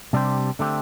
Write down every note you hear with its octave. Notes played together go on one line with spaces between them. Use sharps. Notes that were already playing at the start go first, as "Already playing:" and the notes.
C3 G3 D4 G4 C5
D3 A3 C4 G4